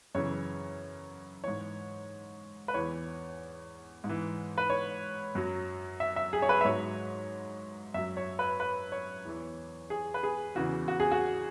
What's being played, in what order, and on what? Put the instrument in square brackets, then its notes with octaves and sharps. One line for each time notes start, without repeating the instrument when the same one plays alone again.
[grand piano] F#2 C#3 E3 C#5
G#2 E3 C#5
B4
E2 E3 C#5
G#2
E3
B4
C#5
F#2 F#3
E5
E5
G#4
C#5
B4
E5
G#2 F#3 C#5
F#2 F#3 E5
C#5
B4
B4
C#5
E2 E3
G#4
B4
G#4
E2 C#3 E3 F#4
F#4
G#4
F#4